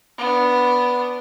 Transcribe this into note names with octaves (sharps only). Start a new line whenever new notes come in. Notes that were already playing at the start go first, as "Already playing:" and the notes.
B3 D4